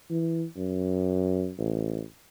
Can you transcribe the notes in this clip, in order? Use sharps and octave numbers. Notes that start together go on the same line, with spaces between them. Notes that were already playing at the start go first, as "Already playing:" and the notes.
E3
F#2
A1